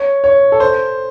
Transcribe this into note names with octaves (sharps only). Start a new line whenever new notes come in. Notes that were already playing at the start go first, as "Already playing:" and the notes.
Already playing: C#5
C#5
A4
C5